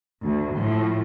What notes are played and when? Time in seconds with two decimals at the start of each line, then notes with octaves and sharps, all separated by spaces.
0.23 D2
0.56 A2 F3